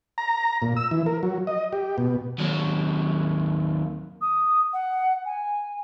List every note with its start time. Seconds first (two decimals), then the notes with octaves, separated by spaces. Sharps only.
0.18 A#5
0.62 A#2
0.77 E6
0.91 E3
1.06 A#4
1.23 F#3
1.47 D#5
1.73 G4
1.98 B2
2.39 D#2 F#3
4.21 D#6
4.73 F#5
5.25 G#5